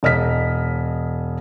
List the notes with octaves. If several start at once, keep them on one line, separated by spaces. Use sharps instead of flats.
E1 D#5 F6 B6